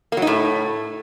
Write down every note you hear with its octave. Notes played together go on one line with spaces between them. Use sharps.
A#3
F#3
D#4
A2